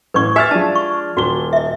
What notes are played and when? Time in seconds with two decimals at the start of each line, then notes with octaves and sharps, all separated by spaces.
0.14 A1 B4 C#6 G#6
0.36 G4 E5 G#5 F6 A6
0.51 F3 G#3 D4 A5
0.76 C#6
1.17 D#1 F#4 G7
1.53 D#5 E5